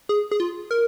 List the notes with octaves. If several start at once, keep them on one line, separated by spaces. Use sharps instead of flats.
G#4
G#4
F4
A#4